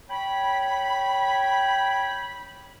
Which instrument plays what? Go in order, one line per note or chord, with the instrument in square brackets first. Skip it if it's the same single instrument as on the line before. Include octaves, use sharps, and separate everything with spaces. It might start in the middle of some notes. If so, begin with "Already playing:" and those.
[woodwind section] C#5 G5 B5